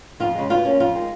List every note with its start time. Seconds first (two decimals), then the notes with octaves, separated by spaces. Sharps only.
0.20 F2 F4
0.35 C#3 G#3
0.50 B2 F4
0.65 A#3 C#4
0.80 F2 F4
0.95 D#3 G#3